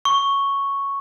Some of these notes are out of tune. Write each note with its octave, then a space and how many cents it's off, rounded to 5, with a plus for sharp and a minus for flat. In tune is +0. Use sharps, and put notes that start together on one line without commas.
C#6 +0